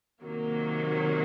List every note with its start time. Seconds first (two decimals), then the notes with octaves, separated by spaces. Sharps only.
0.21 C3 D#3 F#3 A#3